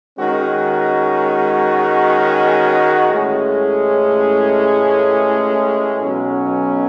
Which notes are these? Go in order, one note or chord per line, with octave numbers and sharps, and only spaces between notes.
D#3 G#3 C#4 F#4
A1 A2 G#3 C#4 G#4
B1 B2 F#3 C#4